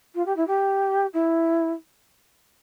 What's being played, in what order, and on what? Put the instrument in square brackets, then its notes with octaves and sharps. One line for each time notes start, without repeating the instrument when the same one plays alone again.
[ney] F4
G4
E4
G4
E4